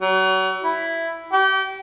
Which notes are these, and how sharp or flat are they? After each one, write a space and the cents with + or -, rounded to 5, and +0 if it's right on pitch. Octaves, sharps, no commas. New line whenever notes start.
F#3 +35
E4 +5
G4 -30